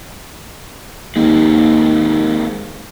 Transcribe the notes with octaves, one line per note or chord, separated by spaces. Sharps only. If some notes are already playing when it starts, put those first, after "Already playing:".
D#2 G#3 A#3 C4